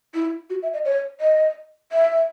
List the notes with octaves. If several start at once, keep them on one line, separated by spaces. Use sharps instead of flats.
E4
F#4
E5
D#5
C#5
D#5
E5